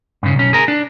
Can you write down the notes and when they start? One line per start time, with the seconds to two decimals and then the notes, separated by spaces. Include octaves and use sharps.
0.23 G2 C#3
0.35 B1 C#4
0.53 G#4 A#4
0.68 D4